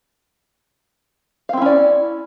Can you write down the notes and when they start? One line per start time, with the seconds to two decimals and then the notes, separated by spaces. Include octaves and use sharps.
1.49 F5
1.53 C4
1.57 E4
1.62 C#4
1.66 D5